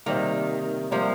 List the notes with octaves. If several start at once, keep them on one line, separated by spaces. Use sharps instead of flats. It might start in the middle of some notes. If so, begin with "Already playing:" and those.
C3 D#3 G3 A#3
C3 F3 G3 A#3